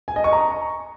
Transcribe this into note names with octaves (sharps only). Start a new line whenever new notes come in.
G#5
D#5
C#6
A#5